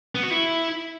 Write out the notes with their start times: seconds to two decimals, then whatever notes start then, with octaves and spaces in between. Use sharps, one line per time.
0.15 B3
0.23 F#4
0.31 E4